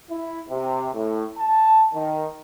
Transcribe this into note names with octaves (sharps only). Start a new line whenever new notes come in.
E4
C3
A2
A5
D#3